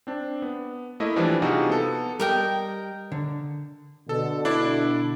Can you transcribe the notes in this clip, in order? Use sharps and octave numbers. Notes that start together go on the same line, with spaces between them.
C4 D4
B3
A3 A#3 E4 D#5
E3 F3 G3 D4
C3 D#4 F4 F#4 G#4
B3 A4
G3 A#4 D#5 G5
D3
B2 D3 A4
D4 E4 D5